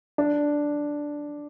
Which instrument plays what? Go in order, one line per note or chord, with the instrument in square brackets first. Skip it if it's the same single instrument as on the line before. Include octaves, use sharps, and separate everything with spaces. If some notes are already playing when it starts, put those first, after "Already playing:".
[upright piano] D4